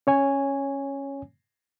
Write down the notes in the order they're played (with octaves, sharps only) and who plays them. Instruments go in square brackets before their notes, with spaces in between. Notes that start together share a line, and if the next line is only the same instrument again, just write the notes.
[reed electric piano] C#4 C#5 G#5